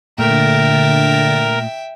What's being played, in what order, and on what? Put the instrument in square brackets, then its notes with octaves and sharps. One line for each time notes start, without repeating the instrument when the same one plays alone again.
[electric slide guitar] A#2 A3 [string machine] D3 A6 [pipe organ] A#4 [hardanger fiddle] E5 G5